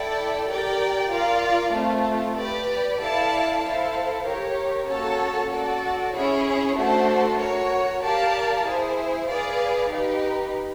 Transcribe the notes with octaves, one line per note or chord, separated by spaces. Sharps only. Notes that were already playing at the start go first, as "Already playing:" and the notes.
Already playing: E4 A4 D5 G5
G4 A#4 D5 G5
F4 A#4 D5 F5
A3 C4 F4
G4 B4 D5
E4 A4 D5 F5 A5
E4 A4 C5 F5
G4 A#4 C#5
A#3 C#4 F#4 A4 C#5
F#4 A4 D5
C#4 E4 G#4 C#5
A3 D4 F#4 A4 C5
F#4 A#4 C#5
G4 A#4 D5 F5 A5
E4 G#4 C5
G#4 B4 D5 F5
D#4 G4 B4